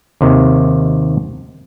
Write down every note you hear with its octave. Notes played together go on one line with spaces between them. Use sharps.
D#2 C3 D#3